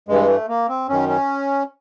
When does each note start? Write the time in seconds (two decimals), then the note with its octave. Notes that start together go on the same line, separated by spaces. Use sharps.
0.09 G2 E3 G#3
0.28 A3
0.48 A#3
0.69 C4
0.89 F#2 D#3 C#4
1.09 C#4